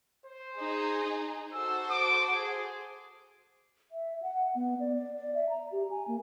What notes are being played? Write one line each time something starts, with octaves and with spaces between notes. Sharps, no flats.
C5
D#4 G#4
F#4 A4 C5 E6
D6
G#4
E5
F#5
B3
D5
D5
D5
E5
A#5
G4
G#5
A#3